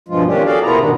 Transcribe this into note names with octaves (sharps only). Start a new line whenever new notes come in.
G2 B2 F3 G#3 F4
D#3 F3 C#4 D4 G4
F#4 G#4 A4 D5 F5
C3 A#3 B3 E4 F4 A#5
G#2 B2 D#3 B3 D4